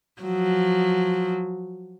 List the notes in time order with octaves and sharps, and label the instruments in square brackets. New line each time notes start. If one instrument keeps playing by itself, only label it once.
[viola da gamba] F3 F#3